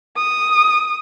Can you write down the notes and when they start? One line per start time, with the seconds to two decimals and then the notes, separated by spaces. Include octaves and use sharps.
0.17 D#6